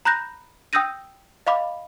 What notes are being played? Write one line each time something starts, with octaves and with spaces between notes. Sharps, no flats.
A#5 B5 F#6 G6 A#6
G5 D#6 E6 G6 A#6 D#7
D#5 F5 B5 D6